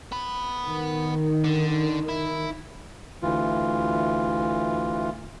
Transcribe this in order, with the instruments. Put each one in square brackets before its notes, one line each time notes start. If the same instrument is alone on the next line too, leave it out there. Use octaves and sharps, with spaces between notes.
[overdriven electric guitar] B3 B5
[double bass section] D#3
[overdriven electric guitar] D3
E4
[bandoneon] D2 E3 F4